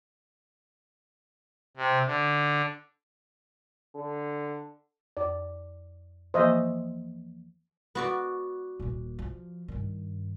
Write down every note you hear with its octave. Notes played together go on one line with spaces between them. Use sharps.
C3
D3
D3
F2 D5
E3 F3 A#3 C5 D#5 E5
B3 F#4 D5
D#1 A#2
F3
G2 D#3